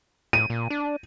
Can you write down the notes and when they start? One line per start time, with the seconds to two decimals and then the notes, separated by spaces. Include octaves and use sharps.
0.33 A2 D#7
0.50 A#2
0.70 D4